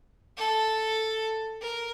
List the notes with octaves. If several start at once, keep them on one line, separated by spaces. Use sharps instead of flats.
A4
A#4